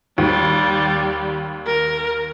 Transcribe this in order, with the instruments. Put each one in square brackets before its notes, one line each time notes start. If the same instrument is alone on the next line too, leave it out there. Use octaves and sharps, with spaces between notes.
[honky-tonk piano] D#2 [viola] G3
[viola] A#4